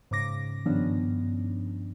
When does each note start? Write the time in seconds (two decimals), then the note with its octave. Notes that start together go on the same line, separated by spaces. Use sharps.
0.11 G#2 C#3 D6 A#6
0.66 G2 D#3 F3 B3 C#4 D4